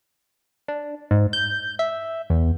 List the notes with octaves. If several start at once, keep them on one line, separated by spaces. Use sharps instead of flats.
D4
G#2
G6
E5
E2